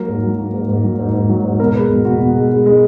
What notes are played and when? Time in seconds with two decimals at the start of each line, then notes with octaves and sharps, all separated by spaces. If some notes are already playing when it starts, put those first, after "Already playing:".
Already playing: F#3 A#3 A#4
0.08 G#2
0.24 F#3
0.39 A#3
0.54 G#2
0.69 G#2
0.84 F#3
0.99 G#2
1.14 G#2
1.29 F#3
1.45 G#2
1.60 B2 A#4
1.75 G#3 B4
1.90 B2 F#4
2.05 B2 F#4
2.21 B2
2.36 G#3
2.51 G#3
2.66 G#3